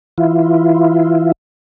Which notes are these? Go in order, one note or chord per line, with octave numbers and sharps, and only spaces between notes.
E3 E4 F4